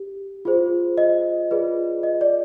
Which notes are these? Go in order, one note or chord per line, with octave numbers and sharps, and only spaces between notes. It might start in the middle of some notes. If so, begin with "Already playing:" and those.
Already playing: G4
F4 G#4 C5
D#5
F4 G#4 B4 D5
D#5
D5